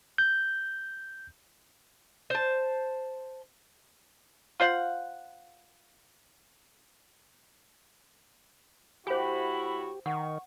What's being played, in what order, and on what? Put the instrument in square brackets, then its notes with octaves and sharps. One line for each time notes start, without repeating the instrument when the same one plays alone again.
[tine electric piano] G6
[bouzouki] C5 A5
[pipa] F4 C5 F5 F#5
[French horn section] A2 E4 F#4 [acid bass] G4 [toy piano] C5 G#5 [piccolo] B5
[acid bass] D#3 [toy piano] F#5 [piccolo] C#6